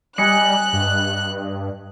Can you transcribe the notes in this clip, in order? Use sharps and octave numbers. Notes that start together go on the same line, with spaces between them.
G3 D#5 G#5 F#6 C#7
G2